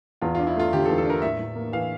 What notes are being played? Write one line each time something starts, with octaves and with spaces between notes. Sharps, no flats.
E2 F4
F4
D4
E4
A3 F4
D3 G4
A4
E2
A4
D4 A#4
A2 E5
A2
A#3
E3 F5